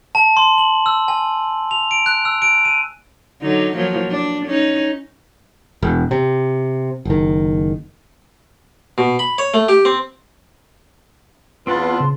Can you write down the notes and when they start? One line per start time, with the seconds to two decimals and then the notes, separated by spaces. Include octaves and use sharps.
0.15 A5
0.37 C6
0.58 F#7
0.86 E6
1.08 G#5
1.71 F7
1.91 D7
2.06 F#6
2.25 E6
2.42 D7
2.65 D#7
3.42 D3 F#3 D#4
3.75 F3 F#3 A#3
4.11 D4
4.46 C#4 D#4
5.82 E1
6.11 C3
7.05 F#1 D#3
8.98 B2
9.19 B5
9.38 C#5
9.54 A3
9.69 G4
9.85 C4
11.67 E2 C4 F4 B4 F#5 A5 C6
12.00 C#3